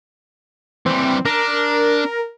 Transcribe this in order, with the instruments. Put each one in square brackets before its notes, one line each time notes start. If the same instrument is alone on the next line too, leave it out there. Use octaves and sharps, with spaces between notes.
[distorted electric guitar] E3 G3 [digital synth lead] C4
[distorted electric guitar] D4 [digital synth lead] A#4